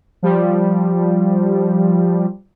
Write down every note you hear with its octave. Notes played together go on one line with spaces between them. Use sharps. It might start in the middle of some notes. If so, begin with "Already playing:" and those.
F3 G3